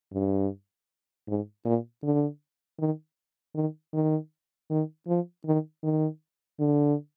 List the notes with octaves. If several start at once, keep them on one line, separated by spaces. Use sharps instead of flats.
G2
G#2
A#2
D3
D#3
D#3
D#3
D#3
F3
D#3
D#3
D3